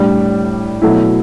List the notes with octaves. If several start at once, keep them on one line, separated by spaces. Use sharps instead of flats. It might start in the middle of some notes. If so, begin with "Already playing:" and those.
Already playing: A2 G3 D4
B2 F#3 A3 E4